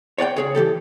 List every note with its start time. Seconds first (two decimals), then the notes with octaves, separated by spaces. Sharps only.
0.18 C#5 D5 F#5 G5
0.36 C#2 G#4 C#5
0.55 E3 F#3 G4 A4